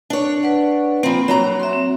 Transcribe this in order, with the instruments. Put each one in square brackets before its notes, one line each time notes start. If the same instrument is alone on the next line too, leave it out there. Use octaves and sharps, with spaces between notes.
[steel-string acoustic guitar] D4 C#5
[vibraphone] B4 D5 F#5
[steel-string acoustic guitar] F3 C4 [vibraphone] A#3 B5
[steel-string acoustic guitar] F#3 F#4 A#5
[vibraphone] E5 C6
C4